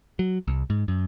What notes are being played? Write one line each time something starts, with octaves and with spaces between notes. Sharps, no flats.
F#3
C2
G#2
F#2